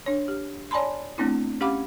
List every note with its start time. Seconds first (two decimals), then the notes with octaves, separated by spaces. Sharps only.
0.06 D4 C#5
0.28 G4
0.71 C#5 D5 G#5 A5 B5 C6
1.18 A3 B3 C4 D4 E4
1.61 C#4 G4 F5 F#5 B5 D6